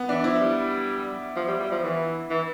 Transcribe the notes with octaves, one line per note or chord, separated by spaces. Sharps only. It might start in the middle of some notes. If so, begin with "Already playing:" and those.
Already playing: B3
E3 D4
F3 E4
G3
F3
G3
G3
F3
E3
E3